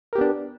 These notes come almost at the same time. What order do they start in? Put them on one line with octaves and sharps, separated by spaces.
A#4 G4 B3 D4